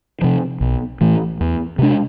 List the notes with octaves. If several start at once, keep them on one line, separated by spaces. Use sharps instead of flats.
C3 F3
B1
A2 E3 A3
E2
C3 G#3 D4